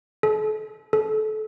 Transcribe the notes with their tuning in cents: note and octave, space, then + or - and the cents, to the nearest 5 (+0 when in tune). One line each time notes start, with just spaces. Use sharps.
A4 -40
A4 -30